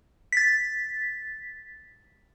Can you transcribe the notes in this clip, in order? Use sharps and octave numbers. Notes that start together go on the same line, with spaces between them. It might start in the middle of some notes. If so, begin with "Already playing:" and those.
A6 B6